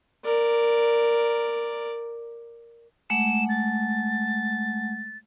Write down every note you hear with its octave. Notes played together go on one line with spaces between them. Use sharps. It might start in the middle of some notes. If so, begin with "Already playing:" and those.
A#4 D5
G#3 A3 F#5 E7
A6